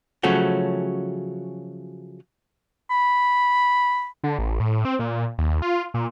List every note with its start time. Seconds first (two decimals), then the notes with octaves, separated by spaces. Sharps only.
0.23 C#3 F3 F#3 A3 C#4 F#4
2.91 B5
4.23 D3
4.38 A1
4.60 A2
4.85 C4
4.99 A#2
5.38 D#2
5.62 F4
5.94 A#2